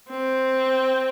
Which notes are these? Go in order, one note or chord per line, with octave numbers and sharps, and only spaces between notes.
C4